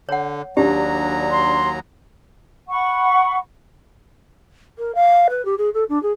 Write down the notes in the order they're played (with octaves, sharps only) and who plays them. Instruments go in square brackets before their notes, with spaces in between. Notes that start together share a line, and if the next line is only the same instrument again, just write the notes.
[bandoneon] D3 [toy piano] C#5 F#5
[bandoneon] D#2 F#3 A#5 [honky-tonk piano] D4 [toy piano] G4
[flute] C6
[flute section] F#5 B5 C#6
[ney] A#4
F5
B4
G4
G#4
A4
D4
G#4